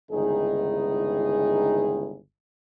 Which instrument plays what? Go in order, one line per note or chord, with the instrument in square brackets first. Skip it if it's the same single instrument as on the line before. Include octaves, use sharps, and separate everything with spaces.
[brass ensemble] G1 C#2 D#3 D#4 E4 G#4